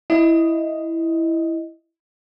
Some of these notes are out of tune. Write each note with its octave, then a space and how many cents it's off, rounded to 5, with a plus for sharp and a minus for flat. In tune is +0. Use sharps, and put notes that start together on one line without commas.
E4 +0 D#5 +0